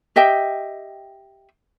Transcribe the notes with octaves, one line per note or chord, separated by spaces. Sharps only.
G4 D#5 E5 G5